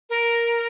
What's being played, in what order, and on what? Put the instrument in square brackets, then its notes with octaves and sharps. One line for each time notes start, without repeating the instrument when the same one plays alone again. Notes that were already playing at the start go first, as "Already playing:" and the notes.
[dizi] A#4